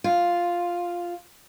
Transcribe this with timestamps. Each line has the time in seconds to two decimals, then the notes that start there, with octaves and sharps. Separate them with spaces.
0.04 F4